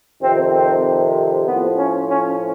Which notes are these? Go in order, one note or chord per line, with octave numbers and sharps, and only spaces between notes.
F2 C3 D#3 C4
C4
A2 F3 B3
C#4
C#4